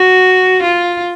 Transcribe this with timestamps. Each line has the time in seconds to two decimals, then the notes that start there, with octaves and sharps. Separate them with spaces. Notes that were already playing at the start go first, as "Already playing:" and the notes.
Already playing: F#4
0.62 F4